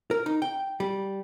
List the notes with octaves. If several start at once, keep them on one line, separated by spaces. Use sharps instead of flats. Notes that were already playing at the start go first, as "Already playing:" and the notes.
A#4
D#4
G5
G3